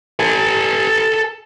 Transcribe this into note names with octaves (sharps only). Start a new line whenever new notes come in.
A4 G#5